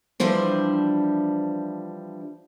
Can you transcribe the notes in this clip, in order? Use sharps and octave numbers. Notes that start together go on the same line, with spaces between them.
E3 F3 G3 D4 C5